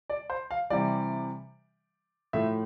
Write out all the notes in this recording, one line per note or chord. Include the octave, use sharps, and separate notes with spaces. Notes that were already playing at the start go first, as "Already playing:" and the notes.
D5
C5
F5
C3 E3 G3 D5
A2 F3 A3 E5